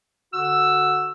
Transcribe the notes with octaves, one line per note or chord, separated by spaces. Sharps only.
D3 F#4 E6